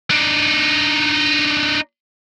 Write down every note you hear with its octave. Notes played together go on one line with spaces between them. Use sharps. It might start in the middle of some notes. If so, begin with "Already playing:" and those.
D4 D#4